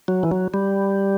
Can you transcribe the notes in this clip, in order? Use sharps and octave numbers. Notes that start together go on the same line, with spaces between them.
F#3
E3
F#3
G3